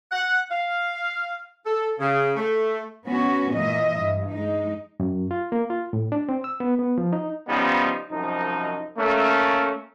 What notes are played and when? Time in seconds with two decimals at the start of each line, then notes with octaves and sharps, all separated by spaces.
0.11 F#5
0.50 F5
1.66 A4
2.00 C#3
2.37 A3
3.07 B3 C#4 F#4
3.53 A#2 E3 D#5 E5
3.99 G2
4.28 G#3 D#4
5.00 F#2
5.31 F4
5.52 A#3
5.70 F4
5.93 A2
6.12 D4
6.29 C4
6.44 E6
6.60 B3
6.79 B3
6.98 F3
7.13 D#4
7.48 C#3 F3 G3 B3 C#4 D#4
8.11 C2 F#2 F3 D#4
8.98 A3 A#3 C#4